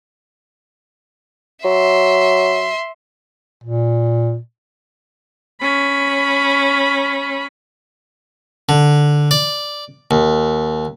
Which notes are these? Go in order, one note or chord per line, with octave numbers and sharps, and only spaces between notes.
F#3 E5 C6
A#2
C#4 B5
D3
D5
D#2